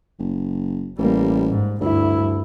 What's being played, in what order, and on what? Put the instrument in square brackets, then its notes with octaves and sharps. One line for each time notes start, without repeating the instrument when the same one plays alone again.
[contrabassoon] F#1
[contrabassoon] A1 [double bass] G3 A#3
[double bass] G#2
[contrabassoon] D2 [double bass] G2 E4